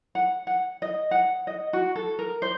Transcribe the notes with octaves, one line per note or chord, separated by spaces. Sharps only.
F#5
F#5
D#5
F#5
D#5
F#4
A4
A#4
C5